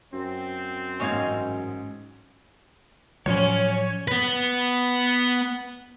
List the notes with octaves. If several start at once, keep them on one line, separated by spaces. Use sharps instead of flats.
F#2 C4
A1 G#2 C#4 D#5 F5 G#6
A2 F3 F#3 C#4 C#5 D5
B3 B4